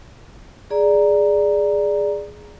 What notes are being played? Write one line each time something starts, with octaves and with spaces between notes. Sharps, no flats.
G#4 D5 A#5